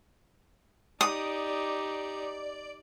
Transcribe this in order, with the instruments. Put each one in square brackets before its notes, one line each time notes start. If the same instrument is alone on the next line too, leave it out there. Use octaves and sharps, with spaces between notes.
[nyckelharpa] D#4 G4 [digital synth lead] D5 [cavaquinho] D#6